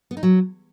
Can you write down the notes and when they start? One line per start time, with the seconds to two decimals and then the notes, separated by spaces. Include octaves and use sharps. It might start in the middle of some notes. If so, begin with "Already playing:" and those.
0.11 B3
0.17 D#4
0.23 F#3